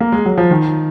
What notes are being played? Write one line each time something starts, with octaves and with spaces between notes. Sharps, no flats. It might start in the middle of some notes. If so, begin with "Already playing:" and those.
A#3
G#3
F#3
F3
D#3